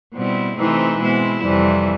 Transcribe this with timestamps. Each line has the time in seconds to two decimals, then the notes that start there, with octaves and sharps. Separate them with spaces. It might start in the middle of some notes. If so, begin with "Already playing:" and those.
0.15 B2 G3 C4 E4
0.58 C3 E3 A3 C4 D#4
1.01 B2 G#3 C4 E4
1.44 F2 C3 E3 G3